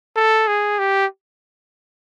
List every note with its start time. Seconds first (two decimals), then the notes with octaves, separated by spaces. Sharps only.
0.16 A4
0.47 G#4
0.79 G4